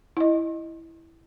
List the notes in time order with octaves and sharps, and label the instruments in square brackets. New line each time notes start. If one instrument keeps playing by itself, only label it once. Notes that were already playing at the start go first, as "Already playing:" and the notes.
[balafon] E4 D#5